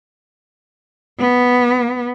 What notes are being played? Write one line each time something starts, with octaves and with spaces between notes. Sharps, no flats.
B3